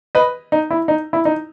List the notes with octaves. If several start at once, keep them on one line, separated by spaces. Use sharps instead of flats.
B4 D#5
D#4
E4
D#4
E4
D#4